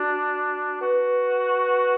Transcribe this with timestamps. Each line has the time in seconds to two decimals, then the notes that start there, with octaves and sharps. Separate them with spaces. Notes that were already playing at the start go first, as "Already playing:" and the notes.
Already playing: D4 F#4
0.81 F#4 B4
1.66 B4